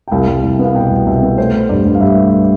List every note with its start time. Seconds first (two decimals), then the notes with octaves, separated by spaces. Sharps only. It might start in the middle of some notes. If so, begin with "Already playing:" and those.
0.08 G5
0.11 C2 F5
0.27 C2
0.43 C2
0.59 B3 F5
0.75 B2 G5
0.90 C2
1.06 C2 E5
1.23 B3
1.37 A3 C5
1.54 A3
1.69 G2 D5
1.85 G2
1.95 F5
2.01 G2 E5
2.16 A3